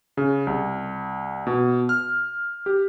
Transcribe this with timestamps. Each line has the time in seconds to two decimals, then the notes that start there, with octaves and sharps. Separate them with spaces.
0.17 C#3
0.47 C2
1.47 B2
1.89 F6
2.66 G4